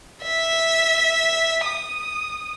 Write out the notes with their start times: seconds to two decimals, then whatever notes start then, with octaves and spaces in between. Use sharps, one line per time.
0.23 E5
1.65 D#6